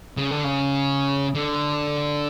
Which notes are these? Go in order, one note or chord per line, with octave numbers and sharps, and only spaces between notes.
C#3
D3
C#3
D3